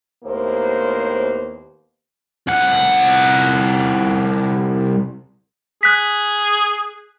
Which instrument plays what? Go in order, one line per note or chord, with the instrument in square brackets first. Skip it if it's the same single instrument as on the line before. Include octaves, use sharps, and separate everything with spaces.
[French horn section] D#2 A2 A#3 B3 C5
[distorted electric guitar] C2 F#5
[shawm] G#4 [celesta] F#6 B6